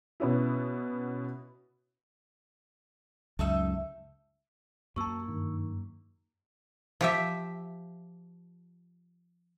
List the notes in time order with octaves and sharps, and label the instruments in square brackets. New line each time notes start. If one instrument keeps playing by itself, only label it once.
[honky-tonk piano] B2 B3 C#4 E4
[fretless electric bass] C#2 F#2 [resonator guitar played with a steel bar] A3 D#4 E5
[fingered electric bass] F#2 A#3 [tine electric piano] F#4 A5 [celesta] C#6 E6
[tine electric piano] G2 [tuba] D#3
[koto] F3 G4 E5